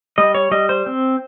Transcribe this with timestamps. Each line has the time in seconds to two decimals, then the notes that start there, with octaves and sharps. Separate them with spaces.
0.18 G3 D#5
0.35 C#5
0.51 G3 D#5
0.69 C5
0.86 C4